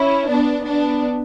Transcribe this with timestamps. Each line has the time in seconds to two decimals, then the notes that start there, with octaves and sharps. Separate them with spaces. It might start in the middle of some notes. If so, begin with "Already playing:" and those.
Already playing: C#4 E4
0.29 B3 D4
0.65 B3 D4